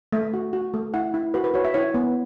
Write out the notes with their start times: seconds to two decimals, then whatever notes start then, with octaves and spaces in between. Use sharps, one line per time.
0.12 A3 E5
0.34 F#4
0.53 F#4
0.74 A3
0.94 E4 F#5
1.14 E4
1.34 F#4 B4
1.44 B4
1.54 F#4 C#5
1.65 E5
1.74 E4 C#5
1.94 B3